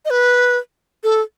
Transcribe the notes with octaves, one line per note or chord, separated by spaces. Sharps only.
D#5
B4
A4